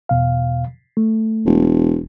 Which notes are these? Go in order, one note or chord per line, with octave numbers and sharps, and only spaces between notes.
E2 B2 F5
A3
E1